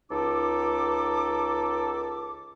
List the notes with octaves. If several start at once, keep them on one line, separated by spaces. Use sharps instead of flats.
C#2 D#4 A4 D6